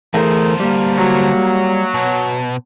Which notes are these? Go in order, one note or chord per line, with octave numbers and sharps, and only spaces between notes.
E2 D3 A3 G#4 A#4 C5
G3 A#3
F#3
B2